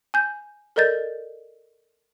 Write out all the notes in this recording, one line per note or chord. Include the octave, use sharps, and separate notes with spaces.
G#5 G6
A4 A#4 D5 D#5 G6 A6